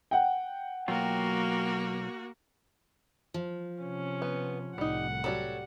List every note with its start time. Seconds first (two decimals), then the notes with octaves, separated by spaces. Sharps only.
0.11 F#5 G5
0.88 B1 F#3 A#3 F4 F#4
3.34 F3
3.83 C3 C#4
4.22 B3
4.78 C2 A2 G3 D#4 F#5
5.24 F#3 G3 F#4 A4 C#5